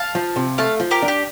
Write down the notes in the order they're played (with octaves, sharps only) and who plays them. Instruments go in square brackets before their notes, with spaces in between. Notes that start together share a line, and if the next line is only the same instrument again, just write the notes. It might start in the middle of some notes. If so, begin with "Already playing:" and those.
Already playing: [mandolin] F5 A5
[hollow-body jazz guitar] F3
C3
[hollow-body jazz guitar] A3 [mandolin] F5 A5
[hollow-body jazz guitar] F3
[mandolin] G4 A#4
[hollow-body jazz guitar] D4
[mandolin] G4